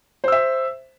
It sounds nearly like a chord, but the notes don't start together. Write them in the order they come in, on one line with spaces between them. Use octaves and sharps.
C5 E6 E5